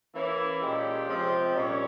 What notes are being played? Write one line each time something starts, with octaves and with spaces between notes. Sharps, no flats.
E3 A#3 C#4 E4
A#2 G#3 C#4 G4
C3 F3 G#3 C4
A#2 G3 C#4 C#5